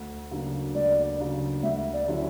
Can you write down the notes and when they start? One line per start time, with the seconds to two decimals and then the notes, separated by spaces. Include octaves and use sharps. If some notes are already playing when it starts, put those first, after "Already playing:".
Already playing: D2
0.31 C#3 F#3 A#3 D4
0.75 D2 D5
1.19 C#3 F#3 A#3 D4
1.63 D2 E5
1.93 D5
2.08 D3 F#3 C#4 E4